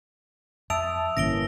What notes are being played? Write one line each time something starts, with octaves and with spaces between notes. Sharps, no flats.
F2 E5 A5 D#6 E6 D7 F7
G1 A2 E3 A#3 C#4 A#6 D7 G7